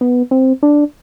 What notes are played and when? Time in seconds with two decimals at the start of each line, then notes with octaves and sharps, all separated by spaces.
0.01 B3
0.31 C4
0.63 D4